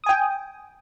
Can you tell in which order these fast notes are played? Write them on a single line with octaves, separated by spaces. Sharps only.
D#6 G#5 G5